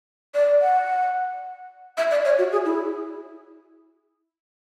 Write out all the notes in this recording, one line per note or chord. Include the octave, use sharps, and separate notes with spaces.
D5
F#5
E5
D5
C#5
F#4
G#4
E4